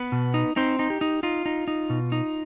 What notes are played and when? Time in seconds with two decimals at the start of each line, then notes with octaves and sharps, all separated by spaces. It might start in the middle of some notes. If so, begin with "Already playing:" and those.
Already playing: B3 B4
0.12 B2
0.34 D#4
0.56 C4 D#4 C5
0.79 D#4
0.90 G4
1.01 D#4
1.23 D#4 F4
1.46 D#4
1.68 D#4
1.90 B2
2.12 D#4